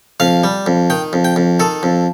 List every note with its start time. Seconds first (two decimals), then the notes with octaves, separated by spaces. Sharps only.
0.20 F2 F5
0.44 G3
0.66 F2
0.90 D#3 G5
1.13 F2
1.25 G5
1.36 F2
1.60 D#3 A4
1.83 F2